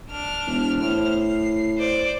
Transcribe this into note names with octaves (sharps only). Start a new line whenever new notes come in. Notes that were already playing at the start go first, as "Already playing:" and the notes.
D4 F6
E1
A2 C5 F6
C7
C5 D5